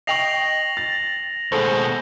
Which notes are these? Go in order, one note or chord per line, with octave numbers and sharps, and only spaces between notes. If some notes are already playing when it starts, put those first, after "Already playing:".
D#5 G5 C#6 A#6 C7 F7 F#7
A6
D#2 B2 G#3 G#4 A4 C5